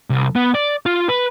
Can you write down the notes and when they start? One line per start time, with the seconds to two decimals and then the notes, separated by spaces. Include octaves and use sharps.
0.10 C2
0.36 B3
0.55 D5
0.86 F4
1.09 B4